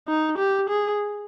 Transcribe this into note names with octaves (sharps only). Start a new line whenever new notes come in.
D#4
G4
G#4